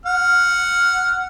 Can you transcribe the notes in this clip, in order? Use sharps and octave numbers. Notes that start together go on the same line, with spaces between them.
F#5 F6